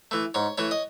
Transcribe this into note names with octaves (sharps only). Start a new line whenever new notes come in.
E3 A3
G#2 C#5
E3 A3 C#5
D#5